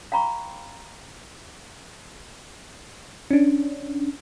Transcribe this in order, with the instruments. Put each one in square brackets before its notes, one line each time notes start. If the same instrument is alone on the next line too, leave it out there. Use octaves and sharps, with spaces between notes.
[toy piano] F5 G5 A#5 B5 C#6
[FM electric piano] C#4 D4